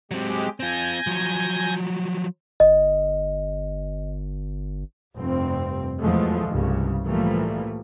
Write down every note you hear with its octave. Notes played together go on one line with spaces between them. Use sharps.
F#3 G#3 C4 G4
C4 F4 G#5 G6 A#6
F3 F#3
G1 D#5
F1 G2 C4
E2 B2 F3 G#3 A3
C2 G2 C#3
A2 E3 F3 G3 A3 A#3